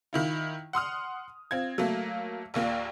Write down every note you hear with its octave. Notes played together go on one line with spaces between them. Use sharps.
D#3 E4 F4
F#5 C6 D#6 F6
C4 F4 G#6
F#3 A3 A#3
A#1 D#2 A#3 F4